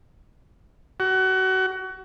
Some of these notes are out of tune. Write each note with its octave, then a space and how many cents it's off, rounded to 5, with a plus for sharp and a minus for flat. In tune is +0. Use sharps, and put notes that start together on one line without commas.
F#4 +30